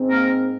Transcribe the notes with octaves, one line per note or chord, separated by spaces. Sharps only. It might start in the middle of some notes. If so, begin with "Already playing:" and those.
Already playing: G#2 C4
A#3 A#4